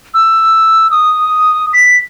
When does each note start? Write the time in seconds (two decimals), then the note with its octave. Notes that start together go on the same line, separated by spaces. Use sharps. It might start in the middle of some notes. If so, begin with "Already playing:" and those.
0.14 E6
0.91 D#6
1.73 B6